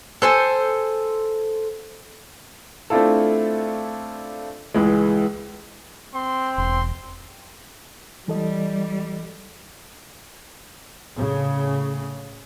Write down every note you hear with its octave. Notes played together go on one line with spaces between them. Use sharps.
A4 C5 G#5
A3 C4 D4 E4 F4 A4
C#2 E3 G#3
C4 C6
E1 C6
E3 G3 A4 D#5
A2 C#3